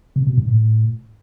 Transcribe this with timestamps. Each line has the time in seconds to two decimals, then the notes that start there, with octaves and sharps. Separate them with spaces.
0.16 C3
0.27 B2
0.37 G#2
0.48 A2